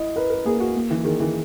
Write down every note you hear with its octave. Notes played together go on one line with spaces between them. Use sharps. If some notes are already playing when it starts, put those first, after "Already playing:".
Already playing: E4 D#5
A#4 B4
A#4
A#3 G#4
F#4
A#3
E3
D#3 G#4
E3